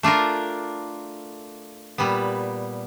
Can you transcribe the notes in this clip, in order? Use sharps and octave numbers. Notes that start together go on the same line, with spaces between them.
A3 D4 F4 A#4
A#2 G3 B3